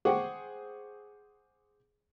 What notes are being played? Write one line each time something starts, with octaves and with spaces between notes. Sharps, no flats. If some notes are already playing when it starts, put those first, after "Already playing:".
G#4 C5 F#5 G5 C#6 D6